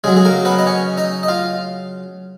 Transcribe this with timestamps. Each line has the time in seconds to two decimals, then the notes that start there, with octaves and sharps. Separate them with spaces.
0.04 C#3 F#3 G#3 G#4
0.16 G#4
0.25 A#3 A#4
0.45 B3 B4
0.59 D#5
0.66 C#4 C#5
0.97 D#4 D#5
1.23 D#5
1.28 F4 F5